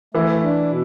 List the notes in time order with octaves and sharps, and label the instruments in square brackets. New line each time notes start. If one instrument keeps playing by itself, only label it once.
[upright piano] E3 E4 [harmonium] A3
[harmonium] D4
B2